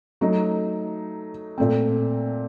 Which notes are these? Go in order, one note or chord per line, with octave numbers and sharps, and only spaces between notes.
F#3 A3 D#4
A#2 A3 C4